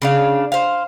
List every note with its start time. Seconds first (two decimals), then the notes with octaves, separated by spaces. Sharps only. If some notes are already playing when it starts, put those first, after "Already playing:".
0.02 C#3 D4 F5
0.52 C5 F5